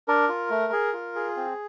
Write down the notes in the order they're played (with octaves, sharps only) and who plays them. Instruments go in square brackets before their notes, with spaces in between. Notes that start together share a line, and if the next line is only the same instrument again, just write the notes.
[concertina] D4 A#4
F4
A3
G#4
F4
G#4
C4